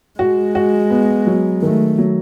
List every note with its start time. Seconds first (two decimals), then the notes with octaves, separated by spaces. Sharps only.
0.19 G#3 F#4
0.55 F#4
0.90 B3
1.27 F#3
1.62 D#3 A3
1.98 F#3